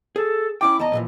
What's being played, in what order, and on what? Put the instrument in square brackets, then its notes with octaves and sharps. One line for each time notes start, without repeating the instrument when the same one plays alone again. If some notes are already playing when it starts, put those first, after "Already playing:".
[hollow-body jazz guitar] G#4 [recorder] A4
[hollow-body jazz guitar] C#4 E4 G5 [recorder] D6
[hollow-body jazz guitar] E2 A5 A#5 [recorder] D#5
[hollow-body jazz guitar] A#2 E3 F3